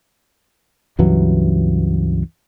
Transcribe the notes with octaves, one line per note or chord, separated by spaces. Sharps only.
C#2 G2 E3 F#3